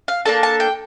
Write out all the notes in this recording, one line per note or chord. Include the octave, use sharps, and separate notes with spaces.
F5
A#3 D4 A4 A5
A5
G5